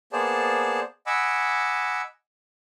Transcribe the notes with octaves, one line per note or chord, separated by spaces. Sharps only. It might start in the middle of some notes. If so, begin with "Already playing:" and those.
A#3 B3 G#4 C5 D5 A5
D#5 F#5 G#5 B5 D6 E6